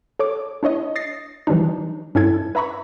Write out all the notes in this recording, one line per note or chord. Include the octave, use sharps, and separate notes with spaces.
A4 C#5 D6
D4 E4 C#5 D#5
D#6 A6 A#6 C7
E3 F#3 G3 D4 D#4
G2 C#4 E4 A4 G#6
B4 E5 A#5 B5 C#6